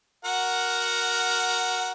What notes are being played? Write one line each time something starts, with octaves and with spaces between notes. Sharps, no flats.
F#4 A#4 F#5